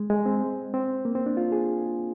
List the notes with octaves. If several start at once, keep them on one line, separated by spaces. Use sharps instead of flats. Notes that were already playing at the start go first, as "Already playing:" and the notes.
Already playing: G#3
G#3
C4
C4
A#3
C4
D4
F4
G#4